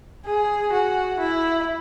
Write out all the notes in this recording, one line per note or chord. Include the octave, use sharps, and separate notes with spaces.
G#4
F#4
E4